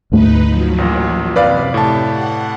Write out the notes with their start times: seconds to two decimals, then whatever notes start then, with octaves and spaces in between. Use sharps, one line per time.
0.12 D2 G#2 A3 D#4 B4
0.48 F3 F#3
0.78 A1 A#2
1.36 F#2 C3 B4 D5 F5
1.74 A2 G4 A5
2.12 F#5